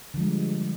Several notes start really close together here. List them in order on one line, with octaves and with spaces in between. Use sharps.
D3 F3 G#3 G3